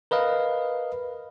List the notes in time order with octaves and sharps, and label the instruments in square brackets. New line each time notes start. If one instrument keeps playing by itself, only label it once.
[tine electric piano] A#4 B4 D#5 F5